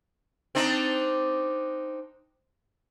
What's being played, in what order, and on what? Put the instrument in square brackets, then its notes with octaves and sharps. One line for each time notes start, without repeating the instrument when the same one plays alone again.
[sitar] C4 D4 D#4